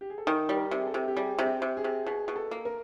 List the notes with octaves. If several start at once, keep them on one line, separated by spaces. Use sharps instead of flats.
G4
G#4
A4
D#3 A#4
G3
A#4
C3
G#4
A4
C3
G4
G3 G#4
C3 G#4
G4
C3
G#4
C3
B2 G#4
B2
A4
A#3
A#4